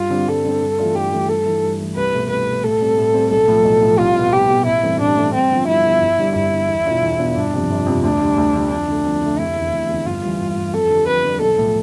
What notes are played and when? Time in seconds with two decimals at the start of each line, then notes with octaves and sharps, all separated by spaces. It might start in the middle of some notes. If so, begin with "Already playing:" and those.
Already playing: G2 F4
0.10 D3 G3 C4
0.27 G2 A4
0.45 D3 G3 C4
0.61 G2
0.78 E3 A3 D4 F4
0.95 G2 G4
1.11 E3 A3 D4 F4
1.28 G2 A4
1.46 E3 A3 E4
1.63 G2
1.79 E3 A3 E4
1.96 C2 B4
2.13 B2 A3
2.30 C2 B4
2.47 B2 A3
2.63 A2 A4
2.81 G3 C4
2.97 A2
3.14 G3 C4
3.30 B1 A4
3.48 A2 F3
3.64 B1
3.81 A2 F3
3.98 C2 F4
4.16 B2 B3
4.32 C2 G4
4.49 B2 B3
4.66 A1 E4
4.83 G2 E3 A3 C4
5.00 A1 D4
5.17 G2 E3 A3 C4
5.34 G2 C4
5.50 D3 F3 B3 F4
5.67 G2 E4
5.84 D3 F3 B3 F4
6.01 G1
6.18 G2 D3 G3
6.35 G1 E4
6.51 G2 D3 G3
6.68 E2
6.86 B2 B3 D4 F4
7.03 E2
7.19 B2 B3 D4 F4
7.36 G1 D4
7.53 F2 C3 F3
7.70 G1
7.86 F2 C3 F3
8.04 D2 D4
8.21 D3 G3
8.38 D2
8.54 D3 G3
8.70 F2 D4
8.88 D3 A3
9.05 F2
9.22 D3 A3
9.38 F1 E4
9.56 E2 D3
9.72 F1
9.89 E2
9.94 D3
10.06 G1 F4
10.23 G2 E3
10.40 G1
10.57 G2 E3
10.73 F2 A4
10.90 D3 G3
11.07 F2 B4
11.24 D3 G3
11.41 B1 A4
11.58 A2 F3